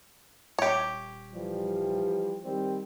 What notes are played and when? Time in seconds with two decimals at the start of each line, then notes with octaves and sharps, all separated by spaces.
0.59 D#1 G4 C#5
1.34 E3 F3 G3
2.44 D#3 G3 C4